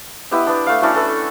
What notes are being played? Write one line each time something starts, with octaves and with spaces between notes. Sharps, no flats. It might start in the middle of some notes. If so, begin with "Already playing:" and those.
B3 E4 G4 D#5
B3 D4
A3 F5
C#4 D4 E4 F#4
A4 B4